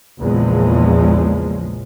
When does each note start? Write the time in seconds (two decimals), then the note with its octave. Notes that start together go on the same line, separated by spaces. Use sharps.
0.20 A#1 E2 C#3 F3 G#3